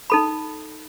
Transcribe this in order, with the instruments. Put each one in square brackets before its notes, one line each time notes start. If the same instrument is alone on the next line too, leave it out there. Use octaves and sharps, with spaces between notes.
[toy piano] D#4 A4 B5